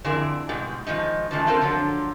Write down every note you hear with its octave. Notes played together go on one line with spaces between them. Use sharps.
F2 D3 E4 G#4 A#4 D5
G#2 B2 G3 G#3
D#3 F3 G#3 D#4
D#3 E3 A3 D4 F4
C4 F4 A4 A#4 C5
D3 F3 F#3 F4